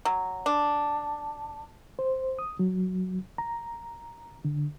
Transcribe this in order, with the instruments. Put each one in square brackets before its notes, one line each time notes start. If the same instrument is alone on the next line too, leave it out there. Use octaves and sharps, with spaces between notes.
[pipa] F#3
D4
[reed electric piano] C5
D#6
F#3
A#5
D3